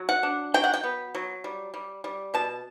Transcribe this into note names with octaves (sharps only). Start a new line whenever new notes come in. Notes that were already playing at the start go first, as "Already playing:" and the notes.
Already playing: F#3
F#5
D4
F#3 G5
F#5
G5
B3
F#3
G3
G3
G3
B2 A5